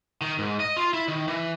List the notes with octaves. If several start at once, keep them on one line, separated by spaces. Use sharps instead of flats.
D#3
G#2
D#5
F4
E4
D#3
E3